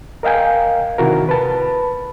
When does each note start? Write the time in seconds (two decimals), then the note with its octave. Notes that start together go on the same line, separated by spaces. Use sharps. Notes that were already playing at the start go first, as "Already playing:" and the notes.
0.23 A#4 D#5 F5 G5 G#5
0.98 C3 D#3 E4 F#4 A#4
1.29 B4 A5 B5